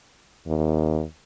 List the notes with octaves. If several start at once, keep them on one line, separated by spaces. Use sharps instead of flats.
D#2